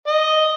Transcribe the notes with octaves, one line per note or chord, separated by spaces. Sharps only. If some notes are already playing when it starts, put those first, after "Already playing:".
D#5